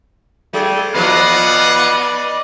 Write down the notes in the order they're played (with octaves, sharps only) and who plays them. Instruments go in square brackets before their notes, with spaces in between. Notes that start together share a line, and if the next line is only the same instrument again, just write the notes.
[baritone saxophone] G3 [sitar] A3 G#4
[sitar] B2 E3 F3 [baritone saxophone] B3 [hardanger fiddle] D5 D#5 [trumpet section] F5 F#5